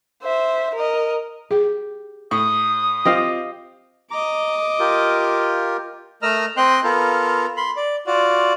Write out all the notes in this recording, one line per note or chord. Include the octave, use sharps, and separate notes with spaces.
C5 E5
A#4 D#5
G4 G#4
A2 C#6 D#6
C4 F4 G4 D#5 F5
D#5 A#5 D6
F4 G4 A#4
A3 A#4 D#5 A#5 E6 F6
C4 D#5 G5 C6 F#6
B3 F4 A4 A#4
B5 C6
D5
F4 F#4 D5